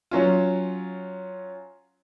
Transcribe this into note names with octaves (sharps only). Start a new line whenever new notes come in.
F#3 C#4 F4